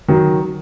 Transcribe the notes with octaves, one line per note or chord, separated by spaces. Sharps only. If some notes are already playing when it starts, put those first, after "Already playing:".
D#3 F#3